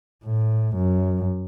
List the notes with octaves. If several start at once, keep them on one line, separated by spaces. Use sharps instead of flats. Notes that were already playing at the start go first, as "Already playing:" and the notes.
A2
F#2